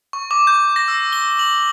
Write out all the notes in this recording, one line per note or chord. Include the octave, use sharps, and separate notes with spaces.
C#6
D6
G6
A#6
E6
G7
F#7